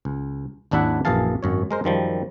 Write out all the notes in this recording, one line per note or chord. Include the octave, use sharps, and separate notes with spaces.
C#2
G#1 D#2 D4 E4 E5 F#5
A#1 F#2 E3 G#4 F5 A5
G#1 F#2 C#5
G#3 A#4 C5
F#2 D#3 F3 G3